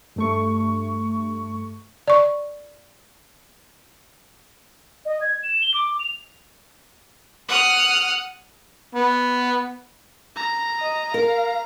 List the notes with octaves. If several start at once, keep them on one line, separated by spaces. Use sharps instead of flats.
G2 A3 C#6
D5 C#6
D#5
G#6
E7
G7
D6
F7
F#5 D#6 F6
B3
A#5
D#5
A#4 F5